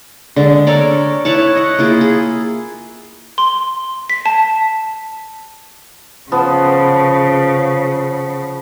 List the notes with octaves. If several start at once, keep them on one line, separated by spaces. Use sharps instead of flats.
D3 G#3 D4
A4 A#4 C#5 D5
E4 C#5 F#5 A5
D#5 F#5
A#3 E4 F4 G#4
G#4
C6
B6
A5
C#3 F3 B3